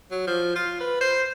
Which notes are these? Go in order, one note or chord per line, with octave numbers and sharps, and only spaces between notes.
F#3
F3
F4
B4
C5